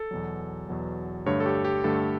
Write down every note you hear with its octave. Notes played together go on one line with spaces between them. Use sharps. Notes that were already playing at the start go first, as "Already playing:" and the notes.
Already playing: A4
E2 B2 F#3
E2 B2 F#3
G2 D3 A3 C#5
A4
G4
G4
G2 D3 A3 A4